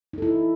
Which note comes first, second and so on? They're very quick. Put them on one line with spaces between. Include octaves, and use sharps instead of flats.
D#4 A4 E4